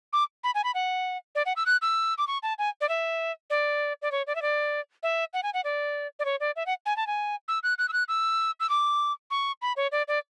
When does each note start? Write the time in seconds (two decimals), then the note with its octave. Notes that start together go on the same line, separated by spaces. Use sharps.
0.13 D6
0.44 B5
0.55 G#5
0.64 B5
0.75 F#5
1.35 D5
1.46 F#5
1.56 E6
1.66 F#6
1.82 E6
2.18 D6
2.27 C#6
2.43 A5
2.59 G#5
2.81 D5
2.89 E5
3.50 D5
4.02 D5
4.12 C#5
4.27 D5
4.35 E5
4.42 D5
5.03 E5
5.33 F#5
5.43 G#5
5.54 F#5
5.64 D5
6.19 D5
6.25 C#5
6.40 D5
6.56 E5
6.66 F#5
6.86 G#5
6.97 A5
7.07 G#5
7.48 E6
7.63 F#6
7.78 F#6
7.89 E6
7.93 F#6
8.08 E6
8.60 E6
8.69 D6
9.31 C#6
9.62 B5
9.76 C#5
9.92 D5
10.08 D5